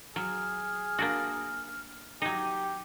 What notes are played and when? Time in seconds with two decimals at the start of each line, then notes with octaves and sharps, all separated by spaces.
0.16 F#3 G#4 F6
0.98 A#3 D4 F#4
2.22 F#3 D#4 G4